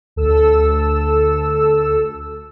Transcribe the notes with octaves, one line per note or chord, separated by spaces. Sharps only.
D2 A4 E6